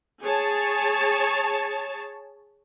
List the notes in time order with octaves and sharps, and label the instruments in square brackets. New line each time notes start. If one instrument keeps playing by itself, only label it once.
[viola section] G#4 C#5 A5